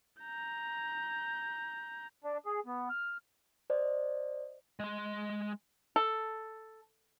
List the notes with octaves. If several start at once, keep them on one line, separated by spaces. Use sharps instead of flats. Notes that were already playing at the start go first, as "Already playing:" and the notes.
A#5 G6
D4
G#4
B3
F6
C5 D5 D#5
G#3 C6
A4